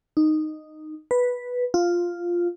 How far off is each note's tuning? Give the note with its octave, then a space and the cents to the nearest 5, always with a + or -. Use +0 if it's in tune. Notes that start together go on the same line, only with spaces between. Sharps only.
D#4 -10
B4 -5
F4 +0